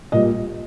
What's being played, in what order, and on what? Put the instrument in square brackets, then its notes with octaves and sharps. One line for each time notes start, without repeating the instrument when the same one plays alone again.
[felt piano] A#2 G3 D#5